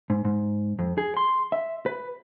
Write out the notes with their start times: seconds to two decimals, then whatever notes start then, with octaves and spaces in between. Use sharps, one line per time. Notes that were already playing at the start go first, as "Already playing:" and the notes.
0.10 G#2
0.25 G#2
0.79 F2
0.98 G#4
1.17 C6
1.52 E5
1.86 B4